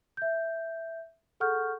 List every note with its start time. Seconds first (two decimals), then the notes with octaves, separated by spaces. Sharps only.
0.17 E5 G6
1.40 G#4 A4 F#5 C#6 F6 G6